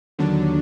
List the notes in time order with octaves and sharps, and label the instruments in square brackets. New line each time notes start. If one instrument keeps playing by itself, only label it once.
[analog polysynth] D#2 D3 F#3 D4